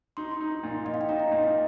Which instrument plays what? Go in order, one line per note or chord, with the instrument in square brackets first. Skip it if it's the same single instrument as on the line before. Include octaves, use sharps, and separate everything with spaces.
[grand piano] D#4 [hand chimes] C6
[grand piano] D#4
A#2
[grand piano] A#2 [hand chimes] D#5
[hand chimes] F5
G5
[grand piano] D#4 [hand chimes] A#5
[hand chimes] D#5
[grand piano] A#2 [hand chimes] D#5
[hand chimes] F5